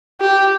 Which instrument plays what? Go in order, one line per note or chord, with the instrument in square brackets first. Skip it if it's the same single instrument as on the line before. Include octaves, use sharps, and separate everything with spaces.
[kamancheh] G4